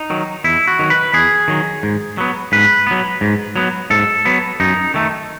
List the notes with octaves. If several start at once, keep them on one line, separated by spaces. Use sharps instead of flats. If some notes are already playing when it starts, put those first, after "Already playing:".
Already playing: D#4
D#3 F#3
E2 E4
F#4
D#3 F#3
B4
E2 G#4
D#3 F#3
G#2
F#3 B3
G#2 B4
F#3 B3
G#2
F#3 B3
G#2 A4
F#3 B3
F#2 D#4
D#3 A3